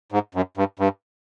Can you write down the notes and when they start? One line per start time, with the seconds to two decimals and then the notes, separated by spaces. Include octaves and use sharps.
0.12 G#2
0.35 F#2
0.57 G2
0.79 G2